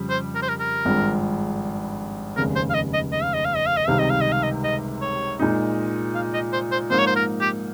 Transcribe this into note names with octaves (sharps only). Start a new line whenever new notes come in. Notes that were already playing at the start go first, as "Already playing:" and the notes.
Already playing: F2 C#3 G3
C5
A#4
C5
A#4
A#4
G#1 G2 F3 G#3
F1 D#2 C#3 G#3 A#4
C5
F5
D#5
D#5
D#5
F5
D#5
F5
D#5
F5
D#5
C#2 C3 D#3 G3 F5
D#5
F5
D#5
F5
D#5
D#5
C#5
A#2 G#3 D#4
F5
D#5
C5
C5
G#2 F3 A#3 D#4 C5
C#5
C5
A#4
G4